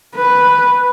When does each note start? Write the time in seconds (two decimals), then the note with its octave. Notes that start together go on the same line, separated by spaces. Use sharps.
0.15 B4